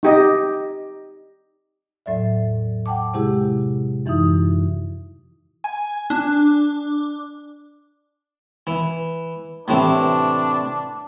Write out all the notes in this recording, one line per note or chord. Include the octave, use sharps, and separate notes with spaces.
D#4 G4 D#5
E2 A2 F#3 D5 E5
F#5 G5 A5 D6
C3 G#3 E4 G4 G#4
F#2 E3 D#4 E4 D#6
G#5
D4
E3
A2 C3 E3 D4